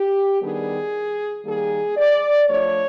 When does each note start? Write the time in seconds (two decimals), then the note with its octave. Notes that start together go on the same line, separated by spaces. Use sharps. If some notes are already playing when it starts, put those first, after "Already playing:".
Already playing: G4
0.42 D#3 G3 B3 D4 G#4
1.45 D#3 G3 A#3 G#4
1.97 D5
2.48 F3 A3 D4 C#5